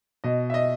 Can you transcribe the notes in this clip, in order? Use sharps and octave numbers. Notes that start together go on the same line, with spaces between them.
B2 D#5
E5
D#5